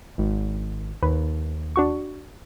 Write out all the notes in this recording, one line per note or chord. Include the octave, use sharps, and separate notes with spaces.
G#1
D#2 B4
D4 F#4 C#6